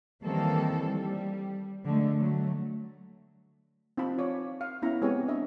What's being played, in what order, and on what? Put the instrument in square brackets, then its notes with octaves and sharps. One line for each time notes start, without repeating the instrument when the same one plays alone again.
[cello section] D#3 E3 G3 A#3 C4 A4
G3
D3 G#3 A3
F#3 A3
[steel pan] C4 D#4 F4 A5 B5
F4 C#5 D5
F5
B3 C#4 E4 E5 A#5
G#3 B3 C4 G4 C#5 G#5
D4 D#5 E5